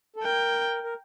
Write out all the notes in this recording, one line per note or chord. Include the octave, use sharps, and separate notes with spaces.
A4
A#4 G5
A#4